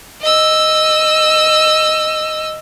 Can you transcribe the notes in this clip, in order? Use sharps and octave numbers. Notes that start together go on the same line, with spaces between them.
D#5 E6